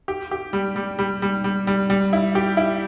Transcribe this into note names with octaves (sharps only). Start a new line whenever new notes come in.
G4
G4
G3
G3
G3
G3
G3
G3
G3
E4
G4
E4